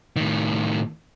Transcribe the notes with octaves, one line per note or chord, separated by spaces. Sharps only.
A2 D#3